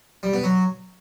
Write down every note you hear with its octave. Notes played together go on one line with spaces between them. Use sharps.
G3
B3
F#3